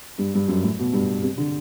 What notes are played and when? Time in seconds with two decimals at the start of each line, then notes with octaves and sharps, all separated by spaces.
0.18 G2
0.34 G2
0.48 F#2
0.63 A2
0.79 B2
0.93 G2
1.23 C3
1.38 D3